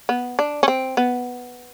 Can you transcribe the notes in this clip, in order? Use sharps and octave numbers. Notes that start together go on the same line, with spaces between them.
B3
D4
C#4
C4
B3